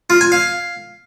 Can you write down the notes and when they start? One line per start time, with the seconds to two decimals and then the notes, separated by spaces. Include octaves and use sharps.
0.10 F4
0.21 G#5
0.32 F5